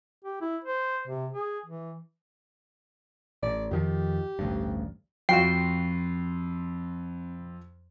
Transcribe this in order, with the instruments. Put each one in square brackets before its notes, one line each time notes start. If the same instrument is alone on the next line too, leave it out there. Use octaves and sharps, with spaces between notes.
[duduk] G4
E4
C5
C3
G#4
E3
[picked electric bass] A1 [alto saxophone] D5
[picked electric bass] F2 D#3 F3 [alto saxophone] G4
[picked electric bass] A1 D2 G2
[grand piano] F2 [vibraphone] C4 B5 [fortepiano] F4 F#4 G5 [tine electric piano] C7